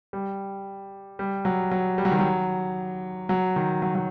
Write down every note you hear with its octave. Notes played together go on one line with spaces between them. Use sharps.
G3
G3
F#3
F#3
G3
F#3
D#3
F#3
F#3
D#3
F#3
F#3